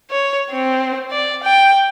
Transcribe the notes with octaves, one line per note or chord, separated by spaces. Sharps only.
C#5
C4
D5
G5